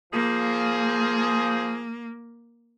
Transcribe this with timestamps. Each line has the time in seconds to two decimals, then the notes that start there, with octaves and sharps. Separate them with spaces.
0.13 F3 A#3 G#4